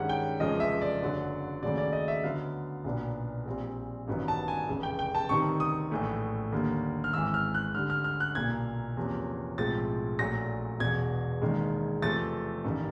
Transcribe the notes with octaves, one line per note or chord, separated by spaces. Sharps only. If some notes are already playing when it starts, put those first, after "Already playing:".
Already playing: G2 D#3 G#3 C#4 F#5
G5
F1 E2 C#3 F3 G#3 D#5
E5
D5
F#1 F#2 D3 F#3
D#2 C#3 F#3 A3 D5
D5
D#5
E5
D2 D3 F#3 B3 F5
B1 A#2 F#3 B3 D4
A#1 A#2 G3 C4
A1 G2 D#3 F#3 B3
A5
G#5
F1 E2 C#3
G5
G5
A5
D2 C3 D#3 G3 C4 C#6
D#6
A#1 A2 E3 A3
D#2 D3 G3 A#3
F6
G#1 G#2 E3 E6
F6
F#6
D2 D3 G3 F6
F6
F6
F#6
B1 A#2 G3 A#3 G#6
E2 C3 F3 A#3 C#4
B1 A2 F3 G#3 C4 A6
A#1 A#2 F#3 A3 A#6
E1 E2 B2 G#6
E1 D#2 D#3 G#3
E2 C3 F3 A3 C4 A6
A1 G2 D#3